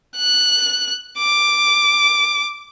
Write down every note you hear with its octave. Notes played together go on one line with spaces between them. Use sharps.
F#6
D6